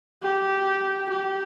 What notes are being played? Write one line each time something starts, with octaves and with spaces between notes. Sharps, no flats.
G4
G4